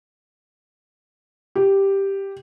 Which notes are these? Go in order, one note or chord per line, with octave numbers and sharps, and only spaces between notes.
G4